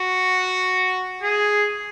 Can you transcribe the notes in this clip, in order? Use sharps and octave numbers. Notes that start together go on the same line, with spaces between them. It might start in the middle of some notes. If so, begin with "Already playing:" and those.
Already playing: F#4
G#4